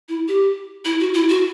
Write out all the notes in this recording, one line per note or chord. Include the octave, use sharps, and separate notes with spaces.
E4
G4
E4
F#4
E4
F#4